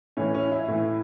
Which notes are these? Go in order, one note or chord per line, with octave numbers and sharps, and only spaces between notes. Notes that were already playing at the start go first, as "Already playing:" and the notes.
A2 E3 C#4
C#4
E4
A2 E3